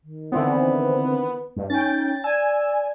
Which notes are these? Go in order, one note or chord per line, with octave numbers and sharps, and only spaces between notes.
D#3
D3 E3 B3 C4
G2
C#4 D#4 G5 A6
D5 G#5 E6